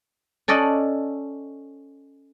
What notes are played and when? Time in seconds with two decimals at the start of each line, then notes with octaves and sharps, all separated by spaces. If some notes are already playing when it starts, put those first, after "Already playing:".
0.48 C#4 A4 D5 D#5 F#5